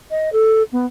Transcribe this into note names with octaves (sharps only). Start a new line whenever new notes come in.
D#5
A4
B3